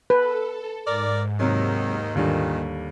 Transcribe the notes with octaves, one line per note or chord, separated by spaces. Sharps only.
A4 B4
G#2 A#4 D5
D#2 C3 D#3 F#3
D#2 A#2 D3 D#3 G3